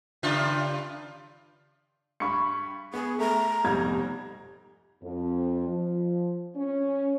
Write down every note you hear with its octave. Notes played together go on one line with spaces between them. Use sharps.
G2 C#3 F4
G2 B5 C#6 C#7
B3 G#4
A3 A#5
F1 G#2 B2 G3 G#6
F2
F3
C#4